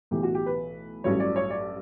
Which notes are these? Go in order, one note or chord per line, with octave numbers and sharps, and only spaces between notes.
B1 A2 E3 G4
F#4
G4
B4
A1 G2 F#3 C#5
D5
C#5
D5